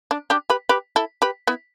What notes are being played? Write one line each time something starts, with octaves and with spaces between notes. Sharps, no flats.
D4
D4 G4
G4 B4
G4 B4
E4 A4
G4 B4
B3 E4